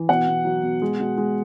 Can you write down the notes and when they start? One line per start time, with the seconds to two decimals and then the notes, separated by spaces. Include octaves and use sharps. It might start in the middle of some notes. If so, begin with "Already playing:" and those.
Already playing: E3
0.09 B2 F#5
0.27 B2
0.45 F#3
0.63 B2
0.82 G#3
1.00 B2
1.17 G#3